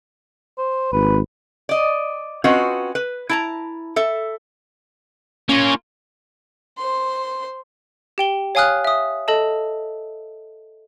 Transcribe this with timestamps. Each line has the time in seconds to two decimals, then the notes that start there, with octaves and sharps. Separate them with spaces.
0.58 C5
0.92 G#1 B4
1.69 D5 D#5
2.44 C4 C#4 F4 F#4 B4 D#5
2.95 B4
3.29 E4 A5 A#5
3.96 A4 E5
5.49 A#3 C#4 F4
6.77 C5 C6
8.18 G4 G5 G7
8.55 C#5 F5 G#5 D#6 F6 F#6
8.85 E5 D#6
9.28 A4 D#5 A5